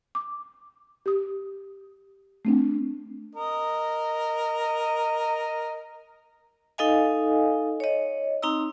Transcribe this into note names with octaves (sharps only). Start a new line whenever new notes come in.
D6
G4 D#6
A3 C4 D4
A#4 D#5
D#4 A4 D#5 F5 G#5
C#5 D#5
C4 D#4 A#5 E6